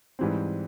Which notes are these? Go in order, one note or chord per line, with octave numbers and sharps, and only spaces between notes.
G#2 E3 G3 C4